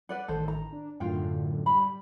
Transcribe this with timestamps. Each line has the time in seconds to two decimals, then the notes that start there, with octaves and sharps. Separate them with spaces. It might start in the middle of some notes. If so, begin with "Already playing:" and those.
0.09 B4 D5 F#5
0.28 A1 D#3 A4 C5
0.48 A#5
0.72 D4
1.00 F#2 A2 D3 F4 F5 G5
1.66 G3 B5